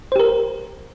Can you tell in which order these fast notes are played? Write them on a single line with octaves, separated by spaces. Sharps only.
C5 G4 A#4